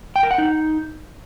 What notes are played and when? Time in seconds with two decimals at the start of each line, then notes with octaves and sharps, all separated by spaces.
0.16 G5
0.23 A#4
0.31 F#5
0.38 D#4